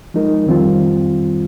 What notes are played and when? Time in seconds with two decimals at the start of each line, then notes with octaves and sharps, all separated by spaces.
0.14 F3 G#3 D#4 A#4
0.46 F2 D#3 G3 C4 F4